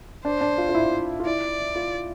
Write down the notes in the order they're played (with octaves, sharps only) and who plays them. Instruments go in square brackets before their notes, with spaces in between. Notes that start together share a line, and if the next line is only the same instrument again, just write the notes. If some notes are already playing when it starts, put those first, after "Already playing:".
[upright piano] D4 [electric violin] C5
[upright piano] D4
F4
F4
E4
F4
[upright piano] E4 [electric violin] D5
[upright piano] F4